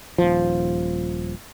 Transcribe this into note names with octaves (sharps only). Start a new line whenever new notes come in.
D#1 F3